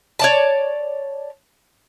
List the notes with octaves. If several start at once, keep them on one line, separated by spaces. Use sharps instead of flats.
C#5 D5 A5